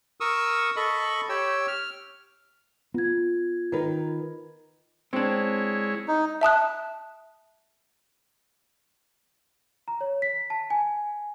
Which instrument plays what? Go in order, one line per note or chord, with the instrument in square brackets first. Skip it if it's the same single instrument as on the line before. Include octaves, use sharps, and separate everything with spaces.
[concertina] A#4 C#6 D#6 E6
A4 D#5 B5 C#6
G4 C#5 G5 E6
F6
[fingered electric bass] B3 [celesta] F4 G#6
[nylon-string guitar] D#3 A#4 B4
[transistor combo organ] G#3 E4 C#5 [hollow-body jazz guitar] C4 D4
[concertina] D#4
[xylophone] E5 A5 D#6 F#6
[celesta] A#5
C#5
B6
A5
G#5